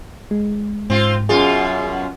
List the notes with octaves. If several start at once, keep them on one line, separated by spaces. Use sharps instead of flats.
G#3
G#2 C4 F4
F#2 B2 F4 G#4